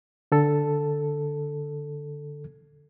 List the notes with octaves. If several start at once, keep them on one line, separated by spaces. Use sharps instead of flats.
D3 A4